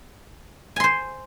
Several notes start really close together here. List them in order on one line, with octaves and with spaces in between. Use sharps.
G#5 C6 C5